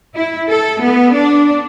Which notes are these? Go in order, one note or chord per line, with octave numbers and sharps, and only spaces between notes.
E4
A4
B3
D4